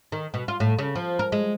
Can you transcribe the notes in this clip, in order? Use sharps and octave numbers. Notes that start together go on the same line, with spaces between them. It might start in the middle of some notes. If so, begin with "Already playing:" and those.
D#3
B2
F4
A2
C#3
F3
A#4
G#3